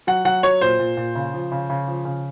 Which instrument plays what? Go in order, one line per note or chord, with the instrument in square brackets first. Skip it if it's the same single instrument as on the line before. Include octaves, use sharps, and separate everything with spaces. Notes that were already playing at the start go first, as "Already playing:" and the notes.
[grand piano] F#3 F#5
F#3 F#5
F#3 C#5
A#2 C5
A#2
A#2
C#3
F3
C#3
C#3
F3
C#3